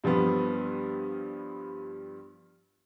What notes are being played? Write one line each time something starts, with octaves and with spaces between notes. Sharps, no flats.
G2 F3 G3 B3